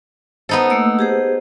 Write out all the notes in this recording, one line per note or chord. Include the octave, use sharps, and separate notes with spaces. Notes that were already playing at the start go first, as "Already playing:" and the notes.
B3 D#4 A4 C5
A3 A#3 E6
G4 G#4 C5